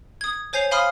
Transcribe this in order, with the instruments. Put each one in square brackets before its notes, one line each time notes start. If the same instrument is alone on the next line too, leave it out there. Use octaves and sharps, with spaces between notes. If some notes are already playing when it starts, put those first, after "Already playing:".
[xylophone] D#6 G#6
C5 C#5 G#5 G6 C7 F7
F5 G#5 B5 C6 D#6 F6